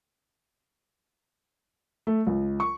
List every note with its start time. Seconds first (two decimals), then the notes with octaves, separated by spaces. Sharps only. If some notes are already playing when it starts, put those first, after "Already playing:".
2.07 A3
2.27 C#2
2.60 C#6